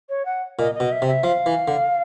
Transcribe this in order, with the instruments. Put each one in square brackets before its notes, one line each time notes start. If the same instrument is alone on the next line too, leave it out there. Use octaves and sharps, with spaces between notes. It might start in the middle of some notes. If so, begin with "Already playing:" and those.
[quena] C#5
F#5
[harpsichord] A#2 [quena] D#5
[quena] D#5
[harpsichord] B2
[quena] E5
[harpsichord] C3
[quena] E5
[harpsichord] F3 [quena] F5
[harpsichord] E3
D3